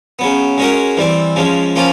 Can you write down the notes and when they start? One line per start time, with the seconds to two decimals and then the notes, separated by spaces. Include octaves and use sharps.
0.19 C#3 F#3 B3
0.58 G#3 C#4 F#4 A#4
0.97 E3 G3 C4
1.36 C#3 F3 G#3
1.76 F3 A#3 C#4 F4